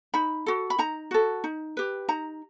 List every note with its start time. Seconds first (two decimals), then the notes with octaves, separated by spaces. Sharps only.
0.14 D#4 B5
0.46 F#4 A4
0.70 B5
0.78 D#4 A#5
1.11 F#4 A4
1.44 D#4
1.77 G4 B4
2.08 D#4 A#5